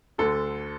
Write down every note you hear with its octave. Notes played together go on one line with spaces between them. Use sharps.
D2 D3 A4